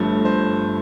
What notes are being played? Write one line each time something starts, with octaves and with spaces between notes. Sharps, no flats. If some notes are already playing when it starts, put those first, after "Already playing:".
Already playing: G1 G2 F3 A3
C5